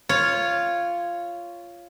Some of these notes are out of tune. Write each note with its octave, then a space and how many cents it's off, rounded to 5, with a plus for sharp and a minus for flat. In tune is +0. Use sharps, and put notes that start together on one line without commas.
F4 -10 C#5 +0